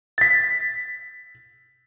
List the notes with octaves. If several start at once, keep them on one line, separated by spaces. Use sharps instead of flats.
A6 B6